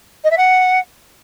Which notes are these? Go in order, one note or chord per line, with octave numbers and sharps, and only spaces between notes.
D#5
E5
F#5